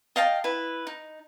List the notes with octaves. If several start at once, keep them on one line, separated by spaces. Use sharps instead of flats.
D#5 F5 G5 A5
E4 B4
D#4